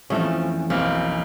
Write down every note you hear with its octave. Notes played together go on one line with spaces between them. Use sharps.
F2 E3 F3 A3 C4 C#4
B1 A#3 C4 C#4 F6